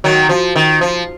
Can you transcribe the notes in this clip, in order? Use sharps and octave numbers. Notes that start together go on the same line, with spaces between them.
D#3 F#3
F3
D#3
F3